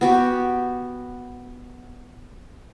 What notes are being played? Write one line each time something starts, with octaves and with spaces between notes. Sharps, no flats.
B3 F#4 G4